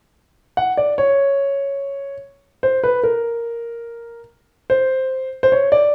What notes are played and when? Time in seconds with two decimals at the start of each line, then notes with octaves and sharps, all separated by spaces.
0.57 F#5
0.77 D5
0.98 C#5
2.63 C5
2.84 B4
3.03 A#4
4.70 C5
5.43 C5
5.52 C#5
5.72 D5